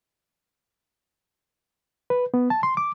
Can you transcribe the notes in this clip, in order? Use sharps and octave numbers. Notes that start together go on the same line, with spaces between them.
B4
B3
A5
C6
D6